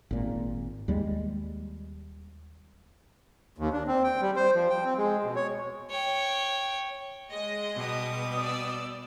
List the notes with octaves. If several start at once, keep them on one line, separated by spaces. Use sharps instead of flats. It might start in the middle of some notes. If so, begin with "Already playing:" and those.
G#1 A#2
D#2 G3 G#3
D#2
D4
C4
G5
G3
C5
F3
G5
C4
G#3
B2
C#5
C#5 G5
G#3 D#5
B2 G3 D#6
D5 E6